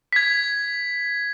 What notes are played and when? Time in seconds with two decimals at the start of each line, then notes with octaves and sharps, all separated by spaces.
0.13 G#6 B6